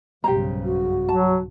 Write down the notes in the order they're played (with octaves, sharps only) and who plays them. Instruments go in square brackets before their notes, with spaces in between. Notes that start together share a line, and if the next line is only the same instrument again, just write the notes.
[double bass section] B1 G2 C#3 [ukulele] G4 C5 A#5
[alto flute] F#4
[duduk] F#3 [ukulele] A5